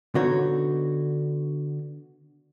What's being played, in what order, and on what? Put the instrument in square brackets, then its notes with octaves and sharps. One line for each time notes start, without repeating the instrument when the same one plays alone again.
[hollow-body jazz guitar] D3 B3 D#4 F#4 C#5